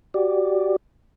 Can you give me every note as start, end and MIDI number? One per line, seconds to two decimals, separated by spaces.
0.14 0.76 66
0.14 0.76 67
0.14 0.76 74